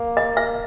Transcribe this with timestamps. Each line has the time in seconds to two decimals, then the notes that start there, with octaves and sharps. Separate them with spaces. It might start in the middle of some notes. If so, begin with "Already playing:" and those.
Already playing: A#3
0.17 D#5
0.37 E5